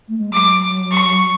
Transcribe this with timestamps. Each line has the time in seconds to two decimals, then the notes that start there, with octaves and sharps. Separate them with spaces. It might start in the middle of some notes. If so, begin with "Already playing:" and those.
0.09 A3
0.18 G#3
0.33 F#3 D6
0.92 C#6